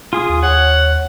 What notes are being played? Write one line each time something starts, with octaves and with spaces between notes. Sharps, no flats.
F4 G#4 D#6
D#2
C#5 F#5